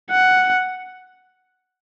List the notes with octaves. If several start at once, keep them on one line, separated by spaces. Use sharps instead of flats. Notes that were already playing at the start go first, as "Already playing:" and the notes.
F#5